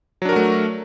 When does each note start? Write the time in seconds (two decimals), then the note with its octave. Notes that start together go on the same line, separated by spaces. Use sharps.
0.22 F#3
0.25 D4
0.29 A#4
0.33 F#4
0.36 A3